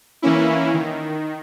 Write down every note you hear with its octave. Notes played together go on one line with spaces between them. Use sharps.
E3 A#3 C#4 E4
D#3